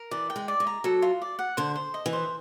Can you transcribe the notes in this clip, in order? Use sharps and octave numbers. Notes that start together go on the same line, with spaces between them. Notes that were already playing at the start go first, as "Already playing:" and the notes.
Already playing: A#4
E3 D5
G5
G#3
D5
G#3
A#5
F#3 A4
F4
D5
F#5
D3 C5
C5
D#5
E3
C5